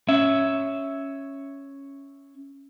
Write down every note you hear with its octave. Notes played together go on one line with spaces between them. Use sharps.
C#4 E5